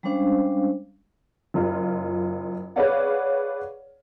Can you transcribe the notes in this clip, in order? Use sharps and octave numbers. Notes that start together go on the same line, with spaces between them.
G3 G#3 C#4 D4 C5 F5
F#1 F4
G#4 B4 C#5 D5 F5 F#5